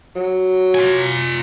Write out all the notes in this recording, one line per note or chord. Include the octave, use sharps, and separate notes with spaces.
F#3
F4 G#5